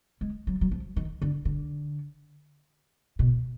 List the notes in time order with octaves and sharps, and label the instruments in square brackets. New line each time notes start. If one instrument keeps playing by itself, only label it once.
[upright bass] G#3
F#3
F#3
F3
D#3
D3
D3
B2